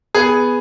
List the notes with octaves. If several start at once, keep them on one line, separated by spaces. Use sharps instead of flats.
B3 G#4